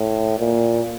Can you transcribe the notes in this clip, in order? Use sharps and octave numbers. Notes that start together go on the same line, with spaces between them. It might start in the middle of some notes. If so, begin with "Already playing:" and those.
Already playing: A2
A#2